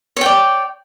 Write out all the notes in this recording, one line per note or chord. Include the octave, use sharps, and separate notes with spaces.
C#5 D5 G5